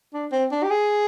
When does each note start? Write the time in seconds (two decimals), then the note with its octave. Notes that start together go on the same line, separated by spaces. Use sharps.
0.13 D4
0.32 C4
0.51 D4
0.63 G4
0.70 G#4